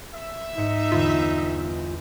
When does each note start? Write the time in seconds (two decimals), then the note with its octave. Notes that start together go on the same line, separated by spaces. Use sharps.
0.14 E5
0.57 G#2 D#4 C#7
0.92 G1 E2 F4